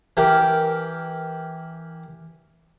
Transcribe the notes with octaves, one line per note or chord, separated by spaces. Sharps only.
E3 G4 A#4